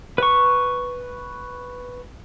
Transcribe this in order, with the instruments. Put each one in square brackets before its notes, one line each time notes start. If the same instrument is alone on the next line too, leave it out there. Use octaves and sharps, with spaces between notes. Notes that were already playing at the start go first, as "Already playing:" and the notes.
[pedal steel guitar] B4 C#6